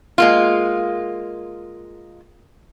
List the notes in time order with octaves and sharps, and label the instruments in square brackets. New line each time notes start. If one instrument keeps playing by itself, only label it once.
[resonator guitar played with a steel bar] G#3 A#3 F4